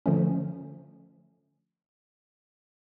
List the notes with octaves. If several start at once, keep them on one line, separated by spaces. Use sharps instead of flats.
D3 F3 A3 C#4